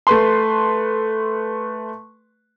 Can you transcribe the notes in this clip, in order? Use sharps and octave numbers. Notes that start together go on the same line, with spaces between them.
A3 B4 C6